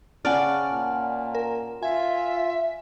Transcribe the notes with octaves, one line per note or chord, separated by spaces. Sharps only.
C#3 C#4 D5 F#5 A5 F6
A#2
A#4
F4 E5 G#5